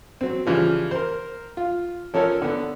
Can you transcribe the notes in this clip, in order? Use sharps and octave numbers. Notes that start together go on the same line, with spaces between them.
F#3 C4
C#3 E3 F3 G3
A#4 C5
F4
F3 C#4 A4 A#4 C#5
D3 B3